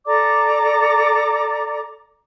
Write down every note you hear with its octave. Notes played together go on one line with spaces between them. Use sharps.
A4 D5 A#5 D6